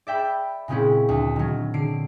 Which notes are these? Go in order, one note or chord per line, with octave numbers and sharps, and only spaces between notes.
D5 E5 G5 B5
A#2 C#3 G#3 C4 C#4 E4
D2
D#3 F#3
D3 C7 D7